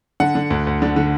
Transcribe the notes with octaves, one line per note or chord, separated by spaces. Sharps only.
D3 F#5
D3
D2
D2
D3
D3